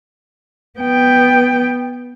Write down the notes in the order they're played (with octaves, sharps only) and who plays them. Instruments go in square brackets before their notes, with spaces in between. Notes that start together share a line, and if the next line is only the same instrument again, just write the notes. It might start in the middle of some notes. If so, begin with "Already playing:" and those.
[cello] B3 G5